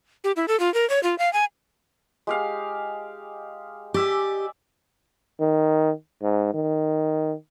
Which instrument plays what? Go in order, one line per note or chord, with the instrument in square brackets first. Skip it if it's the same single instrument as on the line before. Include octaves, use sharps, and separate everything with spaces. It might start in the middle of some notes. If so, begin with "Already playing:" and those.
[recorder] G4
E4
A4
F4
A#4
C#5
F4
F5
G#5
[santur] G#3 G4 F5
[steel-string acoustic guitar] G4 [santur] D5 E5 G#5
[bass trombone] D#3
G#2
D#3